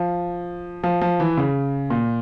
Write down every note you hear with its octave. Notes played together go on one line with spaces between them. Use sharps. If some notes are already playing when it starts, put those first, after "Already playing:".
Already playing: F3
F3
F3
E3
C#3
A#2